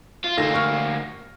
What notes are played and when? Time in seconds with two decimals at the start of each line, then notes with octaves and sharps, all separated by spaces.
0.24 F4
0.37 D2 A#3 D#4 A4 A#6
0.54 C#6 F6